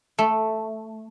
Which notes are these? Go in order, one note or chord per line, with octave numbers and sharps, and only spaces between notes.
A3